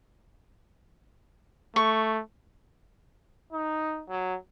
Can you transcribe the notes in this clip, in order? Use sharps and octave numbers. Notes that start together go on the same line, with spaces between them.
A3 C#6
D#4
F#3